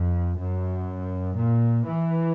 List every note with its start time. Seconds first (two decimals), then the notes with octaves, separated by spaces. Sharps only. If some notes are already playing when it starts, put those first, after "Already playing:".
Already playing: F2
0.39 F#2
1.38 A#2
1.87 E3